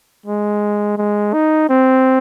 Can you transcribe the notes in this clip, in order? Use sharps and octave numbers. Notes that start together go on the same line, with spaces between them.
G#3
G#3
D#4
C4